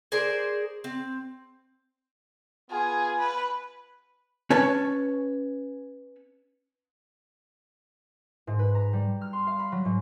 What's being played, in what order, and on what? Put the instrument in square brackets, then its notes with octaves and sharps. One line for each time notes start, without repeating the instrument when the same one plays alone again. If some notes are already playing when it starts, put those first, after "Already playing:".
[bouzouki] G#4 A#4 C5 D5
C4
[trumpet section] B3 F4 G#5 [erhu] G#4
[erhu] B4
[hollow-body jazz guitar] C#4 B4 C#5 A5
[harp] G#2
B4
A#5
G3
F6
C6
F5
B5
F#3
G#2